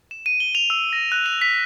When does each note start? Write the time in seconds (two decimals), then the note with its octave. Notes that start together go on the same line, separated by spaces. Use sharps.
0.11 E7
0.26 D#7
0.40 G7
0.55 F7
0.70 E6
0.93 A#6
1.12 F#6
1.26 F7
1.42 B6